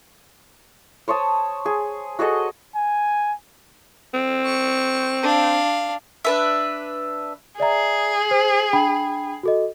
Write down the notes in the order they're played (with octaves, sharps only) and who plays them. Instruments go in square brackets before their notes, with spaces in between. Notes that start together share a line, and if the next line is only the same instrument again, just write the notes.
[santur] C5 C#5 A5 D#6
G#4
F#4 G#4 A4 D#5
[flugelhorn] G#5
[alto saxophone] C4
[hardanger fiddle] C#6
D4 F5
[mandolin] D4 B4 E5
[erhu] G#4 [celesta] D5 E5 A#5
[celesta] C5
D4 G5 B5
F#4 A4 D#5